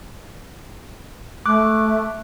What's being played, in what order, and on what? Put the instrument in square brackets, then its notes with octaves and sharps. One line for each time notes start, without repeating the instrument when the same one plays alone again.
[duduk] A3 [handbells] D6 F#6